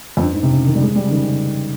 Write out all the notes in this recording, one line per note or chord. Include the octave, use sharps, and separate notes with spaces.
F2
G2
G#2
C3
C#3
D#3
G3
G#3
G3
C#3
D#3
C#3